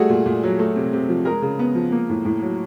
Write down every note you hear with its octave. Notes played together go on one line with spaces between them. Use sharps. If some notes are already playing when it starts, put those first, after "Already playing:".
Already playing: G3 A3 F#4 G#4
A#2
A#2
F#3
A3
C3
C3
F3
G#3 G#4 A#4
C#3
B3
F3
A#3
A2
A2
F#3